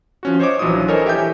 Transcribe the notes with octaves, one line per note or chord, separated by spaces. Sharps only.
F3 C#4 F#4
C5 C#5 D#5 D6
A#1 E3 F#3 D4 F4 D#6
A4 A#4 C5 C#5 D#5 G#5
E3 G4 E5 G5 G#5 G6